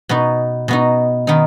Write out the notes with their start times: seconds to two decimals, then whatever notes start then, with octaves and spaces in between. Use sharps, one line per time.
0.09 B2 B3 D#4
0.68 B2 B3 D#4
1.27 D#3 B3 D#4